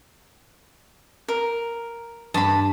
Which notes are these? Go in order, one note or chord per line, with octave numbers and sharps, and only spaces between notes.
A#4
G2 A5 B5